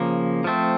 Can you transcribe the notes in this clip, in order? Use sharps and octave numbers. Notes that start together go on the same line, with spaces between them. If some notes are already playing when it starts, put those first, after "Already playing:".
Already playing: C#3 F3 A#3
F3 A3 C4